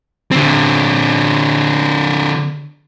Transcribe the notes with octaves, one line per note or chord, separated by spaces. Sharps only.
D3 C4